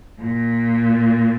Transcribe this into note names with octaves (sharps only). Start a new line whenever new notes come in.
A#2